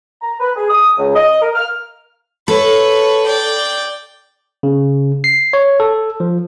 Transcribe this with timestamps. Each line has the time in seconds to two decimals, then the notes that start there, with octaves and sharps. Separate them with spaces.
0.22 A#5
0.40 B4
0.56 G#4
0.69 D#6
0.98 C#2
1.16 D#5
1.42 A#4
1.55 F6
2.48 A4 B4 C#5
3.26 D5 G5
4.63 C#3
5.24 C7
5.53 C#5
5.80 A4
6.20 F3